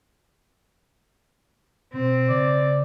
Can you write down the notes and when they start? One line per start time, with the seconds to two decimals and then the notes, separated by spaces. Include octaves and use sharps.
1.93 B2 C4
2.29 C#3 D5